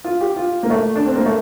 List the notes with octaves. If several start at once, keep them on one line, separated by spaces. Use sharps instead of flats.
F4
G4
F4
A#3
A3
D4
C4
A#3
A3